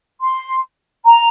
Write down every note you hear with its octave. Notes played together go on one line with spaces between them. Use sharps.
C6
A#5